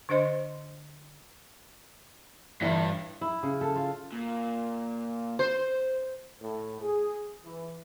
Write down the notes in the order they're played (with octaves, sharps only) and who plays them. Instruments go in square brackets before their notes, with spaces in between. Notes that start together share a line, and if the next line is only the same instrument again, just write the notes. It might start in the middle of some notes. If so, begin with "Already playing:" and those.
[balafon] D3 D4 C5 D#5 C6
[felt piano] G1 E3 [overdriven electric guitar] G2
[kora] E4
C#3
A4
F4
[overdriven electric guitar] A#2
[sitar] C5
[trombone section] A2
G#4
E3